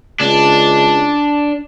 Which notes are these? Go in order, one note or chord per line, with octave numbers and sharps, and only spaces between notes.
C#2 D4